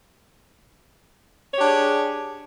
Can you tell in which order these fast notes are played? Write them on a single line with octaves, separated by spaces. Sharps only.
C#5 G4 D4 G#4